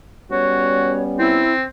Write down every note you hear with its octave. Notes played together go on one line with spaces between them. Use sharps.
G3 B3 C#4 F#4 C#5
C4 E4